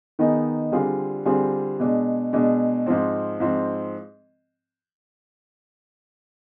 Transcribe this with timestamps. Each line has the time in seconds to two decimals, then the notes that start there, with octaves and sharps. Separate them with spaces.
0.19 D#3 B3 D#4 G#4
0.72 D3 G3 C4 F4 G#4
1.25 D3 G3 C4 F4 G#4
1.80 B2 G#3 D4
2.33 B2 G#3 D4
2.87 G#2 F3 C4
3.40 G#2 F3 C4